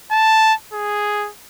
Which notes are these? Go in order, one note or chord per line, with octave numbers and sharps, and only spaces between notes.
A5
G#4